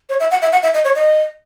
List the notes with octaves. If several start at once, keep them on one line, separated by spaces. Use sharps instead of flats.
C#5
E5
F#5
E5
F#5
E5
D#5
C#5
D#5